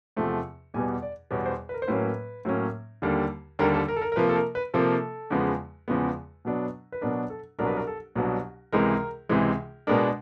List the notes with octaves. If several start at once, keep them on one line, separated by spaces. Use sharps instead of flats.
E2 C3 F3 A3 C4
E2 B2 G3 B3 G#5
D5
E2 B2 G3 B3 C#5
C5
B4
A#4
C5
A2 F#3 A#3 C#4 B4
A2 F#3 A#3 C#4
D#2 D3 G3 A#3
D#2 D3 G3 A#3 A#4
A4
A#4
A4
A#4
A#4
C3 F3 A#3 B4
A4
A#4
B4
C3 F3 A#3 A4
E2 C#3 F3 G#3 B3
E2 C#3 F3 G#3 B3
B2 F#3 B3 D4
B4
B2 F#3 B3 D4 A#4
A4
C2 B2 F#3 B3 D4 A#4
B4
A#4
A4
C2 B2 F#3 B3 D4
C#2 C3 E3 G#3 A#4
C#2 C3 E3 G#3
B2 G#3 B3 D4 A#4